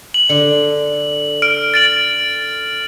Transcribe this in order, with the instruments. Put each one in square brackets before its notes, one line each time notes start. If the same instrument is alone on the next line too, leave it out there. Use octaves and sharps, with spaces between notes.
[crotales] F#7
[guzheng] D3
[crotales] F6 D7
A6 D7 F#7